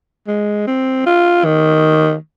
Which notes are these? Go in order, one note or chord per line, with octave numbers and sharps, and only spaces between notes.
G#3
C4
F4
D#3